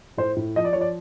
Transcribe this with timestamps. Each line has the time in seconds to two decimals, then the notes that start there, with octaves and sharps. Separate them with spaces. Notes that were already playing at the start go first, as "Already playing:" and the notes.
0.17 A2 C5
0.36 A2
0.56 F3 D#5
0.65 D5
0.73 F3 C#5
0.81 D5